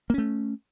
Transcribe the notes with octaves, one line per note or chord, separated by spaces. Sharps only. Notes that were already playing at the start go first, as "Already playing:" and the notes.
A3 A#3 C#4